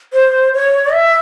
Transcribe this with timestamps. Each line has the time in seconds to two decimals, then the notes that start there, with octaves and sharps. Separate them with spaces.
0.13 C5
0.54 C#5
0.93 E5